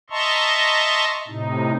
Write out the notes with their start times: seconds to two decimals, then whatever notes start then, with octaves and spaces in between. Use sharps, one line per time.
0.10 D#5 E5 A5 A#5 C6 C#6
1.28 A2 C3 D#4